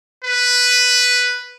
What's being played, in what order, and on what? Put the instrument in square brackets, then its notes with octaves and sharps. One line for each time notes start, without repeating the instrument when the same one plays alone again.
[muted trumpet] B4